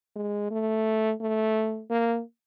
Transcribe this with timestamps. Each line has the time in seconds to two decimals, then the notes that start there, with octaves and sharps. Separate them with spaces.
0.16 G#3
0.51 A3
1.21 A3
1.90 A#3